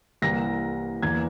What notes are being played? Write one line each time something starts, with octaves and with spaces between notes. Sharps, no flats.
C2 C3 E3 A#3 A#6
E2 E3 A#3 G#6